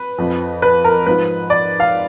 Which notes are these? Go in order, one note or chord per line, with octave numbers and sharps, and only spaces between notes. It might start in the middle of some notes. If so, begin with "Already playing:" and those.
Already playing: B4
F2 F3
B4
A#4
G#2 F3 B4
D5
F5